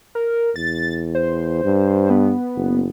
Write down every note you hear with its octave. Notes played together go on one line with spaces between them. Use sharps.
A#4
E2 A6
C5
G2
B3
F#1